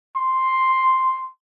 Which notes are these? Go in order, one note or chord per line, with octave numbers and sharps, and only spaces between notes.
C6